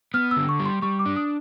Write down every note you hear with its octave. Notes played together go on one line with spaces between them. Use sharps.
B3 F6
E6
D3
C#6
G3
C6
G3 C#6
D6
D4
D#6